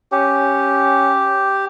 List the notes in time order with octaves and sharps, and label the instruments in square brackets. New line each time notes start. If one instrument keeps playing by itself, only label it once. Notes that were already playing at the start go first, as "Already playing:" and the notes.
[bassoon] C#4 [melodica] G4